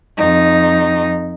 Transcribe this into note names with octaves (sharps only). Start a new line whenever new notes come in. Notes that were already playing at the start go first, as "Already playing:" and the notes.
F2 D#4